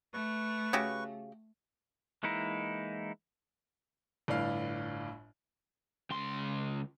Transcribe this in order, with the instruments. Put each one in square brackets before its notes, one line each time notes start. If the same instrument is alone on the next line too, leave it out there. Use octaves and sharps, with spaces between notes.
[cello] A3 [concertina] B4 C#6
[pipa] C#3 F#4 G4
[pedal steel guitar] E3 G#3 A#3 D#4 E4
[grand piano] G1 A2 D4 F5
[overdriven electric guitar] C#2 C6